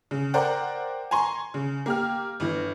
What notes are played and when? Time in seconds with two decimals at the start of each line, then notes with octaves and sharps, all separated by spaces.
0.11 C#3
0.34 A#4 C5 D5 F#5 G5
1.11 G#5 A#5 C6 C#6
1.54 C#3
1.86 A#3 G4 F6
2.40 G1 E3